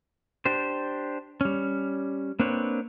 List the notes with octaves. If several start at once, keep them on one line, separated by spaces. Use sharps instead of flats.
D4 G4 C5
G3 C#4
A#3 C4 D4 B4 C#5